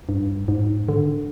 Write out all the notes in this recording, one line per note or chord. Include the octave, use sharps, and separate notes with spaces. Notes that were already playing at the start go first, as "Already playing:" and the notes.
G2
G#2
D3